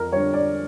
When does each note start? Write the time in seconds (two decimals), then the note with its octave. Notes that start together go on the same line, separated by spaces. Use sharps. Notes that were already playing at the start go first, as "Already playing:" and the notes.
Already playing: F2 A#4
0.12 D3 G3 C#5
0.34 D5